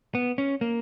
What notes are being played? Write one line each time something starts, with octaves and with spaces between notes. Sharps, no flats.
B3
C#4
A#3